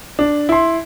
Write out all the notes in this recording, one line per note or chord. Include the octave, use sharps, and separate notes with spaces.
D4
E4 C6